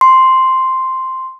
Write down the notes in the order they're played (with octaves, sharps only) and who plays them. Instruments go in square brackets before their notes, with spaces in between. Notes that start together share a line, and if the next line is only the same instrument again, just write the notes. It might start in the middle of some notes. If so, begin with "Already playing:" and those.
[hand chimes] C6